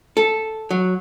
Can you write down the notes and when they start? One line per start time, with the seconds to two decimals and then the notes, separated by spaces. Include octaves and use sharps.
0.17 A4
0.71 F#3